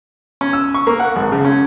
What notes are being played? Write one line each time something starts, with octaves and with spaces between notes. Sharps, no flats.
C#4
E6
C#6
A#3
F#5
G#1
C#3
C#4